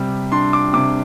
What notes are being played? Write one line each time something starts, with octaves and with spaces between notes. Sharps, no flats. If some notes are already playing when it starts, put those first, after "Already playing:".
Already playing: C3 G3
D4 C6
D6
C3 D6